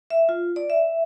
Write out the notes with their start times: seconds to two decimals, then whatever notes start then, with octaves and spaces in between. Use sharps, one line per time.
0.10 E5
0.29 F4
0.56 D5
0.70 E5